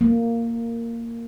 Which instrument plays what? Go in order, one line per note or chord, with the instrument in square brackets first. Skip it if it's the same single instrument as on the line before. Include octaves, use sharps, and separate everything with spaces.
[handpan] A#3